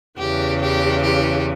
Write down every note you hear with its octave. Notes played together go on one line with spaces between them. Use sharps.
E2 C#3 E3 G4
G4
G4